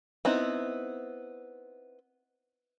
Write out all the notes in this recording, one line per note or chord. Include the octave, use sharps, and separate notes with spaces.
B3 C4 D#4 E4